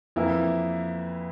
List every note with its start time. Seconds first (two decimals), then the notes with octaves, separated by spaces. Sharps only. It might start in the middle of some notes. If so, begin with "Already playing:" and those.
0.16 F2 E3 A#3 E4